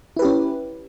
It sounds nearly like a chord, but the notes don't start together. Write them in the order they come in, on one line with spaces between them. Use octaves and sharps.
E4 B4 G4 C#4